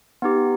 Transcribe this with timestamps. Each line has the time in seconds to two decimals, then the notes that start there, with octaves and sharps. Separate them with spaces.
0.22 B3 D#4 G4